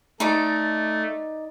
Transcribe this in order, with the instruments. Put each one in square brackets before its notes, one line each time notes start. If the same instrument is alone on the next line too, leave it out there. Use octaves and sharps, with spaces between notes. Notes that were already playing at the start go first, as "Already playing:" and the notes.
[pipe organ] A3 [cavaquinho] D#4 D5 D6